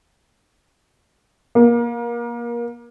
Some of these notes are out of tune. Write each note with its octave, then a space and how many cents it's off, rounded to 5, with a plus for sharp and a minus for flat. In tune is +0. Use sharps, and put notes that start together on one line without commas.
A#3 +25